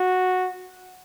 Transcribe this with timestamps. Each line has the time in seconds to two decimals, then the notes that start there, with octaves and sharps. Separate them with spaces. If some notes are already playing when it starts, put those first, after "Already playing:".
Already playing: F#4